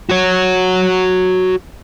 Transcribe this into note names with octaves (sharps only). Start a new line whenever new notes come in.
F#4 C#5